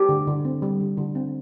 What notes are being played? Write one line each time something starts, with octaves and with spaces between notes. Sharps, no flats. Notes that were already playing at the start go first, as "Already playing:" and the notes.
Already playing: G4
D3
D3
C4
G3
D3
D3
C4